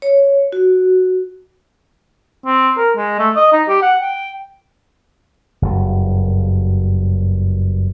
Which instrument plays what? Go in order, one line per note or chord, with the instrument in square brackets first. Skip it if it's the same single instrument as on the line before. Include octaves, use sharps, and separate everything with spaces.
[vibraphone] C#5
F#4
[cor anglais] C4
A#4
G#3
A3
D#5
D#4
G4
F#5
G5
[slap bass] F#1 G2